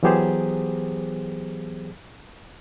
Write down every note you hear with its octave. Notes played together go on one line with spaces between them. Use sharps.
E3 F#3 B3 G4 G#4 C5